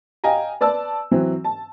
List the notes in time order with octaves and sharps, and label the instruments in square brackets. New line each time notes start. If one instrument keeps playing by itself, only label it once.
[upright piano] D#5 F5 G5 G#5 A#5
B4 D5 A5 E6
E3 F#3 C4
A5